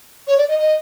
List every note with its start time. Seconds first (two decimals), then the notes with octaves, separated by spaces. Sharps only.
0.27 C#5
0.38 D5
0.48 D#5
0.59 D#5